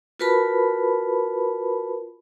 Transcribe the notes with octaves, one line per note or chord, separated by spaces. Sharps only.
F4 F#4 A#4 B4 A5 B5